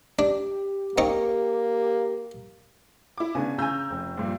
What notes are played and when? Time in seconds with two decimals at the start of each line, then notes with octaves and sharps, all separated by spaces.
0.19 D4 G4
0.98 A#3 C4 D#4 C#6
3.18 E4 D6
3.35 C#3 B3 D4 G#5
3.58 C#3 G#5 A#5 E6 G6
3.90 F1
4.17 A#1 G2 A#2